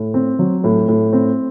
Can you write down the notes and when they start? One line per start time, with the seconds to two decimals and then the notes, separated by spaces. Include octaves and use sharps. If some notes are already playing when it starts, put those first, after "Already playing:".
Already playing: A2
0.14 C4
0.39 F#3
0.64 A2
0.89 A2
1.13 C4